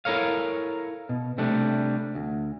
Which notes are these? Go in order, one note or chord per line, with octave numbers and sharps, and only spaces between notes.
E4 A4 A#4 C#5 F5
B2
C3 G3 A3 D4
D2